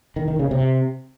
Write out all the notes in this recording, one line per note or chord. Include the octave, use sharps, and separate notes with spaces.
D#3
D#3
C#3
C3